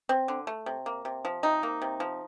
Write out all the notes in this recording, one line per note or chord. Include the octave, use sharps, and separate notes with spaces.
C4
D3
A3
C3
A#3
C3
F3
C3 D#4
A#3
C3
F3